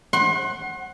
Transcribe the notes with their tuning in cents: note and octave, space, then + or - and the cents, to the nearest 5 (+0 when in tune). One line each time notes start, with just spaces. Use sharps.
F#5 +5 C6 +40